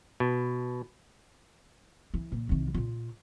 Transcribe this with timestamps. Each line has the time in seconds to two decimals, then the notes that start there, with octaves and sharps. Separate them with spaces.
0.20 B2
2.14 E3
2.32 A#2
2.49 C2 D#3
2.74 A#2 F4